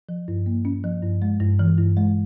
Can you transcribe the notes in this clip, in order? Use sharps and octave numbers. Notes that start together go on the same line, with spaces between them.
F3
G2
A#3
C#4
F3
G2
G#3
G2
E3
G2
G#3